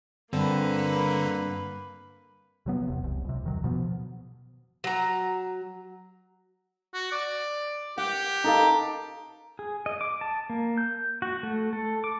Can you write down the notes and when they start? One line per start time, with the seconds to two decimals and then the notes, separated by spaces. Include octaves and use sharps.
0.33 G2 D3 A#3 C4 D4 B4
2.66 C3 F#3 B3
2.88 E1 C3
3.04 C2
3.25 C#2 C3
3.44 E1 D#3 F#3
3.64 B2 F3 B3
4.84 F#3 A#5
6.94 F#4
7.12 D5
7.98 G4 F#5
8.44 D#4 A4 F5
9.59 G#4
9.86 D#5
10.01 D6
10.21 A5
10.50 A#3
10.78 G6
11.22 F#4
11.43 A3
11.73 A4
12.04 D6